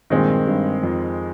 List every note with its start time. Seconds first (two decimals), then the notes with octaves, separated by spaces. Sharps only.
0.10 G2 A#2 D#3 G#3 C4
0.47 G2
0.83 F2